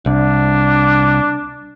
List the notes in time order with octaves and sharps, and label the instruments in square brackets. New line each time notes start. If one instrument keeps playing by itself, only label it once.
[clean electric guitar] C2 [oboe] D4